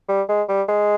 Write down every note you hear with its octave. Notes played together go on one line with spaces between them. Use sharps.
G3
G#3
G3
G#3